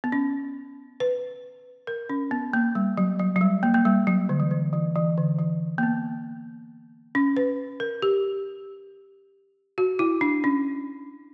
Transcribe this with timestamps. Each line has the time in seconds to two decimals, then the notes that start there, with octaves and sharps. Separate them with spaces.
0.04 B3
0.12 C#4
1.00 B4
1.87 A#4
2.09 C#4
2.31 B3
2.53 A#3
2.75 G3
2.97 F#3
3.19 F#3
3.36 F#3
3.41 G3
3.63 A#3
3.74 A#3
3.85 G3
4.07 F#3
4.29 D3
4.40 E3
4.51 D3
4.73 E3
4.96 E3
5.18 D3
5.39 E3
5.78 A#3
5.83 B3
7.15 C#4
7.37 B4
7.80 A#4
8.02 G4
9.78 F#4
9.99 E4
10.21 D4
10.44 C#4